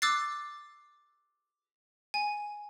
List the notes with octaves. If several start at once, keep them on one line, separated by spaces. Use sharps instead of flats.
D6 E6 F#6 A6 C7
G#5